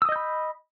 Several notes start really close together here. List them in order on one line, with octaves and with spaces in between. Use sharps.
E6 D#6 D#5 G6 B5